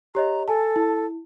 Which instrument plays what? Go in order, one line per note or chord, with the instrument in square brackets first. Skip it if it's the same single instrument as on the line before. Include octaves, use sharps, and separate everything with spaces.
[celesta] G4 C#5 D#5 [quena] A#5
[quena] A4 [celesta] G#5 A5
[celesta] E4